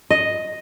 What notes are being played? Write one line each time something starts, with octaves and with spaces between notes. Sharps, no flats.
D#5